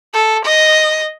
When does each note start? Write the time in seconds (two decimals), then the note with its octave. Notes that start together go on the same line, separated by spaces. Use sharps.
0.14 A4
0.45 D#5